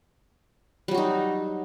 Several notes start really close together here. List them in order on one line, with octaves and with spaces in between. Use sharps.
G3 F#3 F#4 D#4